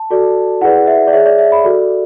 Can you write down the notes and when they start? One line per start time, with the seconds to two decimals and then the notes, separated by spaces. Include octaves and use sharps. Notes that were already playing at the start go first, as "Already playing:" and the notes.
Already playing: A5
0.10 F#4 A4 D5
0.61 E4 G#4 B4 D5 F#5
0.87 E5
1.07 D5
1.13 G#4 C#5 E5
1.26 D5
1.39 E5
1.52 B5
1.64 F#4 A4 D5